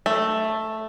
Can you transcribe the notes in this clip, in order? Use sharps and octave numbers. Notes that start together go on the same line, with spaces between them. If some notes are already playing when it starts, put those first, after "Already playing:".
A3